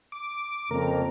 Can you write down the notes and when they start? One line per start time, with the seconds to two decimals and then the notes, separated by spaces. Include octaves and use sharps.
0.12 D6
0.71 F2 C#3 A#3 A#4